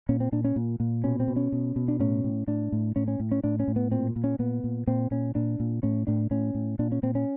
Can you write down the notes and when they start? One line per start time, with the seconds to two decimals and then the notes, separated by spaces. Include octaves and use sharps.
0.09 A#2 C#4
0.20 C4
0.32 A#2 D4
0.44 C#4
0.56 A#2
0.80 A#2
1.04 B2 C#4
1.20 C4
1.28 B2
1.36 C#4
1.52 B2
1.76 B2
1.88 D4
2.00 A2 C#4
2.24 A2
2.47 A2 D4
2.72 A2
2.96 A2 C#4
3.08 C#4
3.20 A2
3.32 C#4
3.44 A2 D4
3.60 C#4
3.68 A2
3.76 B3
3.92 A#2 C4
4.16 A#2
4.24 C#4
4.39 A#2 B3
4.64 A#2
4.87 A#2 C4
5.11 A#2 C#4
5.35 A#2 D4
5.60 A#2
5.83 A2 C#4
6.07 A2 D4
6.31 A2 C#4
6.55 A2
6.79 A#2 D4
6.92 C#4
7.03 A#2 C4
7.15 C#4